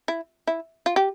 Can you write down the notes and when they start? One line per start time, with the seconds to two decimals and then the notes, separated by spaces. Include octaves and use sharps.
0.08 E4
0.47 E4
0.86 F4
0.96 G4